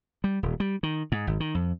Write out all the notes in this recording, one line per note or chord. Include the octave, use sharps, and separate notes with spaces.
G3
D#1
G3
D#3
G#2
G#1
D#3
F2